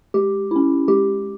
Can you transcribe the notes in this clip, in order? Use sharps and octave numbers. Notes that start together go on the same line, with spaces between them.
G#3 G4
C#4 E4
G#3 G4